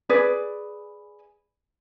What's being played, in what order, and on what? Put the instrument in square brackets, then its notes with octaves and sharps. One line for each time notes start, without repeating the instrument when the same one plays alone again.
[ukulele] G#4 B4 D5